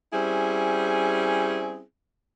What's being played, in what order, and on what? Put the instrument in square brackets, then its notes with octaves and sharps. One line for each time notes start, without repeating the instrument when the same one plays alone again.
[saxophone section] G3 C4 C#4 E4 G#4